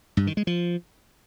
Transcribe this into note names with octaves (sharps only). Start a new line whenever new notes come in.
G2
D#3
G#3
F3